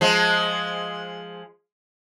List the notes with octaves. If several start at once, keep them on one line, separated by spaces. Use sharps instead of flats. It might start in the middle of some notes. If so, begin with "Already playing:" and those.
F3 G#3